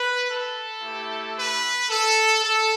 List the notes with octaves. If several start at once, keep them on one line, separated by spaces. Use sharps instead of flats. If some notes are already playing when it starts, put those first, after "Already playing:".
Already playing: B4
A4
A3 E4 G4
B4
A4
A4